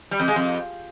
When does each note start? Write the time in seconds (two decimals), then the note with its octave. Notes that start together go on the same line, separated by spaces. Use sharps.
0.11 G3
0.20 F2
0.28 G#3
0.36 F2